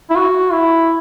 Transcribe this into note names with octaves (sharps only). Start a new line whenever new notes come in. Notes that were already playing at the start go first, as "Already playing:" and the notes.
E4
F#4
E4